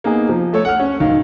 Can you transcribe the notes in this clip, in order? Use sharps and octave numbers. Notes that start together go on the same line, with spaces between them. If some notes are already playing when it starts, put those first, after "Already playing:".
A#3 B3 D#4 G#4
F3
A3 A4 C#5
F#5 F6
C#4
D1 D#3 F5